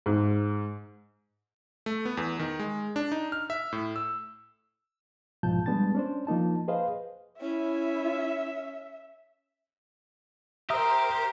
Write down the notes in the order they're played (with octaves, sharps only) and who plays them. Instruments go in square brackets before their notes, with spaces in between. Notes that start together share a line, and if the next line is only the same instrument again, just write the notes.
[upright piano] G#2
[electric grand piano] A3
B3
E2
D#3
G#3
D4
D#4
F6
E5
A2
E6
[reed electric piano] C2 G#2 B2 F3 A5 G6
G3 G#3 B3 D4 A5 A6
C#4 D4 C5
F3 A#3 D#4 A5
G#4 B4 C5 D#5 F5
[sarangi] C#4 [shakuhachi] E4 [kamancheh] E5
[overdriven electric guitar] G4 [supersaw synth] A#4 C5 [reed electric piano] E5 D#6 [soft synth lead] A#5